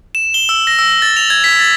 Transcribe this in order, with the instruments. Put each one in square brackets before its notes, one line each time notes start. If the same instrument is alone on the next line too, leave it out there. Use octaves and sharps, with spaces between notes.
[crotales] E7
G7
E6
A#6
E6
A6
F7
G#6
B6
A6